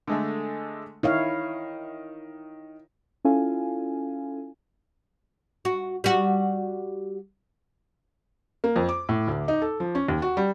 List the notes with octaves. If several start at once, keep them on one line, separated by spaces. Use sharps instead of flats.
D3 G#3 A3
D#3 E4 C#5 F5
C#4 E4 F4 A4 F5 G#5
F#4
G3 F#4
A#3
F2
D6
A2
D2
D#4
A4
F3
C#4
D#2
F#4
G3